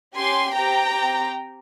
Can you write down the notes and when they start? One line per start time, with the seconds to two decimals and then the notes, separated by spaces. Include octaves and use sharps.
0.16 C#4 G4 G#5 C6
0.55 C4 G4 G5 A#5
0.94 C4 G4